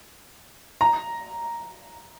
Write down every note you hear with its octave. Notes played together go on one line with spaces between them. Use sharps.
A#5